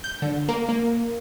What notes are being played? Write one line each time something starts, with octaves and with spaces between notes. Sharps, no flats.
G6
D3
A#3
A#3